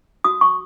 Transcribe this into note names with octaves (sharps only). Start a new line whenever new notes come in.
F#4 D#6
C#6